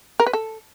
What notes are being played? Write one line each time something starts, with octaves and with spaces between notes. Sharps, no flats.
A#4
B4
A4